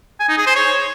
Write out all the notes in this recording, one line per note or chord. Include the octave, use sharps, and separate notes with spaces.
G#5
D#4
G#4
C5
C#5